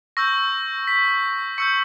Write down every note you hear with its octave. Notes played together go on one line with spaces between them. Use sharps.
C#6 E6 G6 A#6
B6
C#6 E6 G6 C#7